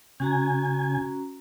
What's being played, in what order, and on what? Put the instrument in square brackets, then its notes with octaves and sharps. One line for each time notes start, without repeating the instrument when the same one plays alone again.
[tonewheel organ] C#3 G#5 [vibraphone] C#4 F#4 A#5